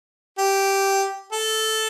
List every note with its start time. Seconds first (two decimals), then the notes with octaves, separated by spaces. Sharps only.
0.38 G4
1.32 A4